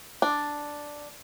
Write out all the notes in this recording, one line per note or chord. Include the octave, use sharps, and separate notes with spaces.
D4